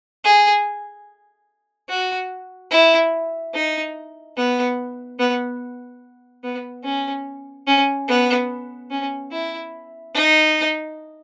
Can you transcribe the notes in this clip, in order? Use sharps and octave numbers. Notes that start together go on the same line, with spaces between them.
G#4
F#4
E4
D#4
B3
B3
B3
C#4
C#4
B3
C#4
E4
D#4